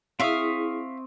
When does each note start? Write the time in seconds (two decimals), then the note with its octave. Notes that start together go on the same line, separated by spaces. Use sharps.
0.20 C4 E4 G#4 E5 F5 C#6 D#6